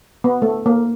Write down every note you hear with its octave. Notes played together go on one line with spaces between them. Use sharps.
B3
A3
A#3